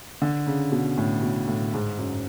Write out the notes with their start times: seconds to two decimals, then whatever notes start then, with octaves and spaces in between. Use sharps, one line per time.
0.22 D3
0.47 C#3
0.72 B2
0.97 A2
1.22 B2
1.47 A2
1.73 G#2
1.99 F#2